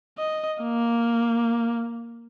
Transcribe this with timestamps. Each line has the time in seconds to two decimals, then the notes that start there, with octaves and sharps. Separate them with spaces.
0.18 D#5
0.62 A#3